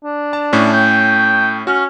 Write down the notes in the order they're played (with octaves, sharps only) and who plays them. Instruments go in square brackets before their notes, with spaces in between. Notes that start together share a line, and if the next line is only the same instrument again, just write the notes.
[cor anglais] D4
[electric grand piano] A5
A2 A3 C#4
[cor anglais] G5
[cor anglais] C#4 [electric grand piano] F#4 F6